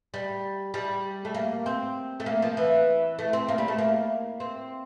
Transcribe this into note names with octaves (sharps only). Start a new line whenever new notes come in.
G3
G3
A3
A#3
C4
A3
A#3
F3
E3
A3
C4
A#3
G3
A3
A#3
C4